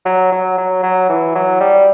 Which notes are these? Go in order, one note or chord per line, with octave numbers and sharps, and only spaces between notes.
F#3
F#3
F#3
F#3
E3
F#3
G3